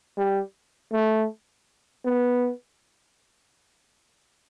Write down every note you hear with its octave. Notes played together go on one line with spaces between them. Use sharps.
G3
A3
B3